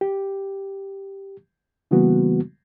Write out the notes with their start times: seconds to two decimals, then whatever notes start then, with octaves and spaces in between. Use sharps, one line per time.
0.01 G4
1.91 C#3 E3 G3 A#3 B3 F#4